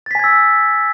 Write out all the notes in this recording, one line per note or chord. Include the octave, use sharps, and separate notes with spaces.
G#5 E6 G#6 A6 B6